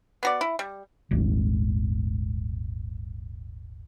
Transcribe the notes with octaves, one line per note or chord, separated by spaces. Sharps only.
B3 F#4 D5
E4
G3
D#1 G#1